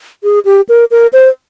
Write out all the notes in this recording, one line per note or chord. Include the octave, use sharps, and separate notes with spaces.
G#4
G4
A#4
A#4
C5